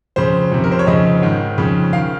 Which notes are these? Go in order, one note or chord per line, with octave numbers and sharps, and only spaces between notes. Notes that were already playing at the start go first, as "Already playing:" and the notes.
F2 C#3 C5
F2 C3 D#3
A#4
C5
C#5
F2 C#3 D#5
G#2 D#3
F2 C#3
D#3 F5